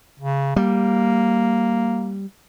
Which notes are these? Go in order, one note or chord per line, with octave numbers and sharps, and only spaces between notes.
C#3
G3 A#3